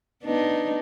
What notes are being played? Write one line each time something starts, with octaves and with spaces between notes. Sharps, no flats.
B3 D4 D#4